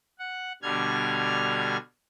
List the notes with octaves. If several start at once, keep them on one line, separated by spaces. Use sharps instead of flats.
F#5
B2 D3 G3 F6 G#6